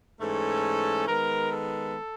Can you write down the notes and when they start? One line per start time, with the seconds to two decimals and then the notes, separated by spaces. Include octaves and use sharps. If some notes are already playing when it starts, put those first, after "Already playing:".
0.19 G#2 E3 A3 C#4 A4
1.07 D#3 G#3 B3 A#4
1.52 A4